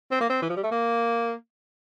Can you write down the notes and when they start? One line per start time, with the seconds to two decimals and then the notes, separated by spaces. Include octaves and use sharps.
0.11 C4
0.21 A#3
0.30 C4
0.42 E3
0.50 F3
0.57 G3
0.63 A3
0.71 A#3